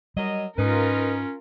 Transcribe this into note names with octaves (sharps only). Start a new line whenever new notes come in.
F#3 G3 A#4 D#5
G#2 C#4 D#4 F4 A#4 B4